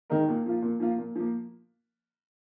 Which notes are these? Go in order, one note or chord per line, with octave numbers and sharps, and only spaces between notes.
D#3 G#3 D#4 A#4
A#2
F3 A#3 F4
A#2
F3 A#3 F4
A#2
F3 A#3